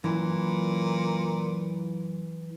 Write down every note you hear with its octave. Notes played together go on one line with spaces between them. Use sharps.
F#2 A#2 E3